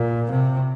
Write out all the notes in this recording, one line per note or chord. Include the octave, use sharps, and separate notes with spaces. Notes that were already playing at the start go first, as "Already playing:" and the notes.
Already playing: A#2
C3